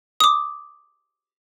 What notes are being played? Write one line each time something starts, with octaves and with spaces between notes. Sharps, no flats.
D6 D#6